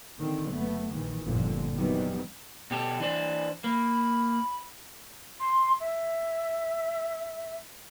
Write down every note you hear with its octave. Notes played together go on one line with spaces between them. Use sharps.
D3 D#3 C4
F#1 A3 B3
A#1 D#3 E3
G1 F2 A#2 D3
C3 D#3 E3 F#3 G3 B3
B2 G4 A4
E3 D4 C5
A#3 B5
C6
E5